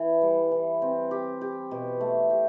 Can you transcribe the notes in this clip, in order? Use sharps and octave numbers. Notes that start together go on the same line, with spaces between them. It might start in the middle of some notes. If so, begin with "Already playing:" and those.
Already playing: E3
G3
E3
C4
G4
G4
B2
A3
G4